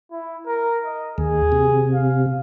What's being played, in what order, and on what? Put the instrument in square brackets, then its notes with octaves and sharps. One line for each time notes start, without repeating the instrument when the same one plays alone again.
[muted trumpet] E4
A#4
D#5
[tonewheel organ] D#2 [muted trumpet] G#4
[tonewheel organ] C3
[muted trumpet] F5